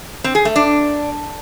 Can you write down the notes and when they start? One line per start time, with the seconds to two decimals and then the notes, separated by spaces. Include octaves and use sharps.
0.24 C4
0.35 G#4
0.45 A3
0.56 D4